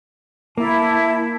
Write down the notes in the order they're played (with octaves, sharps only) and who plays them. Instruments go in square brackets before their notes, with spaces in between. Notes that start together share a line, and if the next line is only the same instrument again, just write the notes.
[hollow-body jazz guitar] A#3 [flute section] E4 A5